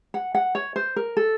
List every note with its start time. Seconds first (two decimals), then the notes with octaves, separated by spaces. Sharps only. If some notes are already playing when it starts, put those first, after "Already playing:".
0.14 F#5
0.35 F#5
0.55 C#5
0.76 C5
0.96 A#4
1.17 A4